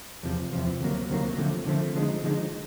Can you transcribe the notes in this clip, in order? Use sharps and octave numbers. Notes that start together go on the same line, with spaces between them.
E2 C3 F3
E2 C3 F3
D2 C3 D#3 F#3 A#3
D2 C3 D#3 F#3 A#3
D3 F3 A3 C4
D3 F3 A3 C4
D3 F3 G#3 C4 D#4
D3 F3 G#3 C4 D#4